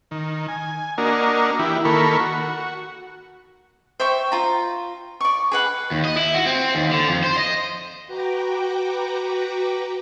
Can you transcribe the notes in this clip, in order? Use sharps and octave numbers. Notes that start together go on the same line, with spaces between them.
D#3
G#5
A#3 D4 F#4 A#4 D#5
E3 E4 G4
D#3 A#3 A4 A#4 B5 C#6
F#4
C5 E5 G5 C#6
F4 A#5
D5 C#6
G#4 B4 F#5
D#2
D#5
E4
F#4
C4
D#2
D3
F2
C5
D#5
F#4 B4 G5 A#5 D6